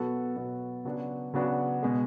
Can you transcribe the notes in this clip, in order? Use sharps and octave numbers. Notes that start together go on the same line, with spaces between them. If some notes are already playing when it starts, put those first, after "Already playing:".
Already playing: B2 F#3 B3 F#4 A4
B2 F#3 B3 F#4 A4
C#3 F#3 B3 D4 F#4
C#3 F#3 B3 D4 F#4
B2 G#3